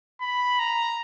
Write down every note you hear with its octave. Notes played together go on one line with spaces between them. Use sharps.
B5
A#5